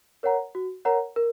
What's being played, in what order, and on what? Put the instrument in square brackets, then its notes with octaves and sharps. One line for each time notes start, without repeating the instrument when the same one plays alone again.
[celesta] A#4 C#5 F#5 A#5
F#4
A#4 C#5 F#5 A#5
A#4